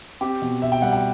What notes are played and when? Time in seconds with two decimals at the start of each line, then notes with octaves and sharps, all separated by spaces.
0.21 C4 G4
0.42 B2
0.62 B2 E5
0.72 G5
0.82 G3 F#5
0.93 G5